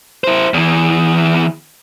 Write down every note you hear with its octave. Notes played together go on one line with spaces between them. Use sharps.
E4 C5
E2 E3